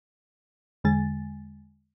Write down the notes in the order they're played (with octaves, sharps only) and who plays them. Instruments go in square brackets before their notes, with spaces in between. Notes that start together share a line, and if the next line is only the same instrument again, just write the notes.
[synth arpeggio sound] E2 D3 G#3 G#5 A6